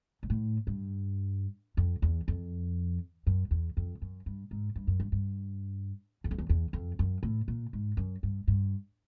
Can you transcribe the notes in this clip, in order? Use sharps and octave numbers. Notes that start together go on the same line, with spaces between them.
G#2
A2
G2
F2
E2
F2
F#2
E2
F2
F#2
G2
G#2
G2
F#2
G2
G2
E2
F2
E2
E2
F2
F#2
A2
A#2
G#2
F#2
G2
G2